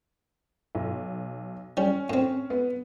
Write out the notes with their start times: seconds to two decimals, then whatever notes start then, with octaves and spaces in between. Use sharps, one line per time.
0.75 B1
1.77 G3 C#4
2.10 A2 C4
2.50 B3